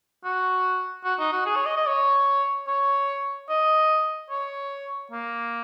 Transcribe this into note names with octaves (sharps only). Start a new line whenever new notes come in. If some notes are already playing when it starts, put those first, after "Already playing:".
F#4
F#4
D#4
F#4
G#4
C#5
D#5
D#5
C#5
C#5
D#5
C#5
A#3